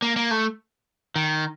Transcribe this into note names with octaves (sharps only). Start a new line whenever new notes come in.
A#3
A#3
A3
D#3